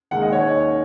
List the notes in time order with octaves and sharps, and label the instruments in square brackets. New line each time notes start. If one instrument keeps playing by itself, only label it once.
[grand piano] D#2 D#3 G#3 F#5
D#5
C#5